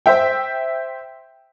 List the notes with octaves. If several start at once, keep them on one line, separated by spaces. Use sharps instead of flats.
C5 E5 G5